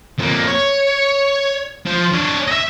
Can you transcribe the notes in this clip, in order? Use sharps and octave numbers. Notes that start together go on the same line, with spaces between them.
F2 A#3
C#5
F3 C5
D4 C#5
D#5 E5